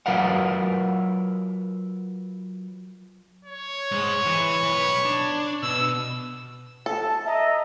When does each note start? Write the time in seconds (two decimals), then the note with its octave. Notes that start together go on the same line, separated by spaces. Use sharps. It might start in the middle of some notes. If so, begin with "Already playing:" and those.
0.06 F#3 F4 A#4 B4 F5 F#5
3.45 C#5
3.92 G#2 G#3
4.26 E3
4.63 B1 B4
5.05 D4
5.63 B2 E6
6.86 A4 A5
7.26 D#5 E5 A#5